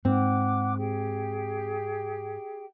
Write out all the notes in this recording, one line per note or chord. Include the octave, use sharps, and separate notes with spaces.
G#2 C4 F#5 D6 F#6
G4 G#4 G5